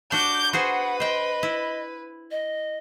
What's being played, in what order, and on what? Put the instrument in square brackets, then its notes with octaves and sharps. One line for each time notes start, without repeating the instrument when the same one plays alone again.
[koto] D4 F#4 [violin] D6 G6
[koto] F#4 G#4 C5 [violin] B4 [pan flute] F#5
[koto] C5 G5 [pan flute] D#5
[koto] E4
[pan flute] D#5